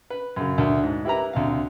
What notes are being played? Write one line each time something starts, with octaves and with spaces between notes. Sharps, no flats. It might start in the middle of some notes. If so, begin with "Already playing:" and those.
B4
F#2 C#3
D2 A#4 E5
G#2
E4 G4 A#4 B4 A#5
D2 C3 F5